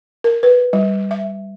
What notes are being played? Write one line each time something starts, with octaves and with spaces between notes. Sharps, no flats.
A#4
B4
G3
E5